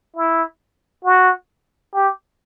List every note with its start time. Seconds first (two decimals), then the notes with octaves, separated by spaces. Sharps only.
0.16 E4
1.05 F#4
1.95 G4